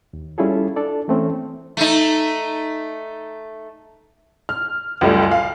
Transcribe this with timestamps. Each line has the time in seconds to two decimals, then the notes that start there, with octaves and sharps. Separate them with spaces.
0.13 D#2
0.38 G3 C#4 E4 F4 G#4 A4
0.76 D4 A4 D5
1.08 E3 A3 C4 C#4
1.77 A3 D#4
4.49 F6
5.01 C#2 F#2 G3 A3
5.31 F5